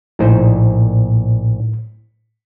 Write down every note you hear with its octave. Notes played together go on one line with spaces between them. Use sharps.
A#1 A2 D#4 C5